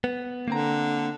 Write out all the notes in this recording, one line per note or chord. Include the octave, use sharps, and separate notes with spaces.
B3
D3 A#3 C4 A#5